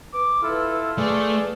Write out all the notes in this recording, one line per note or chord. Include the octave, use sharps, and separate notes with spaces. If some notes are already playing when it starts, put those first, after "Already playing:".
B4 D6
E4 F4 A4
A3 G#4 A4 B4 D5